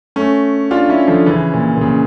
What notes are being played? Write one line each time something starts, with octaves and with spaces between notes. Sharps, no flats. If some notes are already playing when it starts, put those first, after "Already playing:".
A3 C#4
D4 F4
C#4 E4
D3 F3
C#3 E3
A#2
A#2
C#3